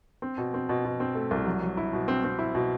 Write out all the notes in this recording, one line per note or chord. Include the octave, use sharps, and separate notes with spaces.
C4
B2
C4
B2
B2
C4
A3
C2
F#3
F#3
E4
B2
C4
C4
E4
B2